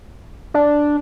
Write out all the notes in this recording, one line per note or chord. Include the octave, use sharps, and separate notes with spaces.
D4